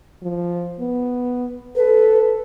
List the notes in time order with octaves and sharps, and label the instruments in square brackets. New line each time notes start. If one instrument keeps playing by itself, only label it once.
[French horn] F3
B3
[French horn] A4 [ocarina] B4